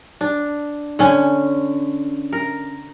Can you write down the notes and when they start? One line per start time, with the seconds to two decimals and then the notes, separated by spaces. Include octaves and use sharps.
0.21 D4
0.99 D3 C#4
2.33 A#4